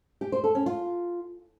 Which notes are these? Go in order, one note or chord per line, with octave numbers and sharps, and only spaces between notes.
G4
C5
A4
C#4
F4